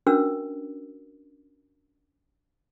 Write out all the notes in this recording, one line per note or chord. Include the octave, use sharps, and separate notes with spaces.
C#4 D4 F#4 A#4 B4 E6